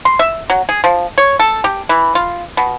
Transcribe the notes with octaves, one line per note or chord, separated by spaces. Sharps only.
C6
E5
F#3
G#4
F3
C#5
A4
G4
E3
F4
B2